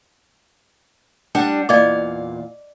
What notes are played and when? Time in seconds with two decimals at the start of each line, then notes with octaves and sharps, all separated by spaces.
1.35 G3 D4 F#5
1.69 E2 A#2 D5 D#5 F5 D6